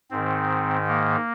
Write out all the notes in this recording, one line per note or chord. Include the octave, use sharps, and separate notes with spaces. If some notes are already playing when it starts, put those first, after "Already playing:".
G#2 D#3 C4
A#3